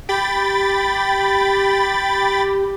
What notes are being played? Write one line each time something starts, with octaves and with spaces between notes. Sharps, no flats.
G4 G5 B5 A6